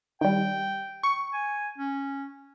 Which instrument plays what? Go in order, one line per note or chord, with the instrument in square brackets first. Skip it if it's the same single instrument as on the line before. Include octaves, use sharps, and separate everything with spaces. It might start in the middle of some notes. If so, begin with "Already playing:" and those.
[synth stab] D#3 G3 [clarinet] G5
[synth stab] C#6
[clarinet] G#5
C#4